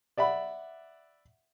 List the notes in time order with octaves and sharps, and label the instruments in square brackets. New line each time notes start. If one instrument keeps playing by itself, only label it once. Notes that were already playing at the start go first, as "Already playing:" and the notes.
[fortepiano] D5 E5 F#5 B5